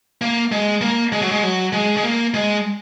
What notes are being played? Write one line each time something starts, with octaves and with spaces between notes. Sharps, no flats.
A#3
G#3
A#3
G#3
F#3
G#3
F#3
G#3
G#3
A#3
G#3